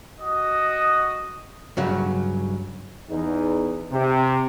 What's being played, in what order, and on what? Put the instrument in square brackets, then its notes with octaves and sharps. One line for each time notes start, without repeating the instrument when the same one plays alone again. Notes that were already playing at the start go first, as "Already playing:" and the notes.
[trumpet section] F#4 D#5 D#6
[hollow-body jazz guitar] G2 C#3 F#3
[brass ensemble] E2 D#4
C3